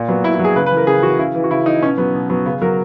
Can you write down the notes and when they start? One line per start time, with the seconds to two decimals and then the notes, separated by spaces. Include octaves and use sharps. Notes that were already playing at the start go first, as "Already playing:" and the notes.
Already playing: A#2
0.08 F#3 B3
0.24 A#2 E4
0.35 E4
0.39 F#3
0.44 G#4
0.56 C#3 B4
0.66 B4
0.72 E3
0.77 A#4
0.87 C#3 G#4
1.03 E3 F#4
1.19 C#3 E4
1.35 E3
1.44 F#4
1.51 C#3 E4
1.66 E3 D#4
1.82 B2 C#4
1.98 F#3 B3
2.14 B2
2.30 F#3 B3
2.46 C#3 B3
2.62 F#3 A#4